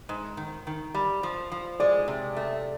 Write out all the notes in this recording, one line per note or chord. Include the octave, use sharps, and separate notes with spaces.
G#2
D#3
D#3
G3
F3
F3
G#3 D5
C3
A3